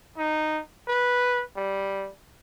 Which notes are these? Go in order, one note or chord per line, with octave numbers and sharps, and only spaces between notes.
D#4
B4
G3